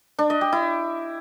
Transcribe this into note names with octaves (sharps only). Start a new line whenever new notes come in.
D4
D#5
G4
E4